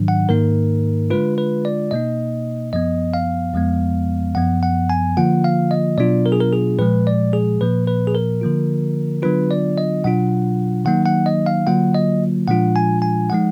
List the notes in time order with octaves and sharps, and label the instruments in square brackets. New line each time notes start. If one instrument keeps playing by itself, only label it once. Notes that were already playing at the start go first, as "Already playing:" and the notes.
Already playing: [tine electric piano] G#2 D#3 F#3 D4
F#5
G#2 D#3 A#3 D#4 A#4
D3 G#3 D4 F4 B4
B4
D5
B2 A#3 D#4 D#5
F#2 F3 B3 D#5
F5
F2 F3 G#3 B3
F#2 F3 B3 F#5
F#5
G#5
D3 F3 A#3 F4 F#5
F5
D#5
B2 F#3 B3 D4 F4 D5
A#4
G#4
A#4
G#4
A#2 F3 G#3 B4
D5
G#4
A#2 F3 A#3 B4
B4
G#4
A#4
D3 F3 A#3 F4
D3 F#3 B3 D4 F4 B4
D5
D#5
B2 F#3 D4 F4 F#5
D#3 F#3 A#3 D#4 F#5
F#5
D#5
F5
D3 F#3 A#3 F4 F#5
D#5
A#2 F3 G#3 D4 F4 F#5
G#5
G#5
F3 G#3 D#4 F#5